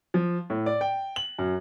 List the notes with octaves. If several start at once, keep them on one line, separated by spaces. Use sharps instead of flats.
F3
A2
D5
G5
F#7
F#2